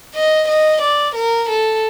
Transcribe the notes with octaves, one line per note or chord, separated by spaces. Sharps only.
D#5
D#5
D5
A#4
A4